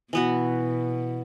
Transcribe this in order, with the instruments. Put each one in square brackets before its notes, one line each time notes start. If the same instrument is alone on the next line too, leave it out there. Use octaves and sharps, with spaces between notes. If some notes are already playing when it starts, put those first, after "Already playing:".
[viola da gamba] B2 [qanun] E3 B3 F#4